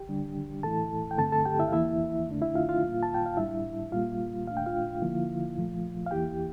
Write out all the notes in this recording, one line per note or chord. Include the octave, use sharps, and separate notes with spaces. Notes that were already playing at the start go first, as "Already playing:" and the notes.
Already playing: G4 G5
D3 G3 D4
A2 E3 A3 E4 A4 A5
G5
G2 D3 A3 C4 A4 A5
A4 A5
G4 G5
E4 E5
F5
E2 E3 A#3 E4 E5
F2 D3 A3 D4
E4 E5
F4 F5
F4 F5
A#2 G3 A#3
A5
G5
F5
A2 G3 D4 E4 E5
A#2 G3 A#3 F4 F5
A#2 A3 D4 F5
G5
F4 F5
D3 F3 A#3 E4
A#2 F3 A3
F5
E2 E3 A#3 E4 G4 G5